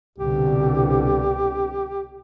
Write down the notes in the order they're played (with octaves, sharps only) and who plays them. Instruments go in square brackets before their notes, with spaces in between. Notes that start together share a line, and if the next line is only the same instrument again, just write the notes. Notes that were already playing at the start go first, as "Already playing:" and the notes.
[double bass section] C2 B2 D3 [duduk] G4